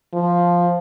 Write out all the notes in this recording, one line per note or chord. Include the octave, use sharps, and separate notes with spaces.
F3